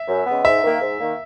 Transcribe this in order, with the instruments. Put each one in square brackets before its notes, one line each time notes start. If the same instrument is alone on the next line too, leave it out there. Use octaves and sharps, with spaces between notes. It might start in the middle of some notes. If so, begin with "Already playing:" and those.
Already playing: [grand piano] E5
[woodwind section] F#2
C#3 G#3 B3
[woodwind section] G#2 [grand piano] E5
[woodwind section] D#3 A#3
G#2
D#3 A#3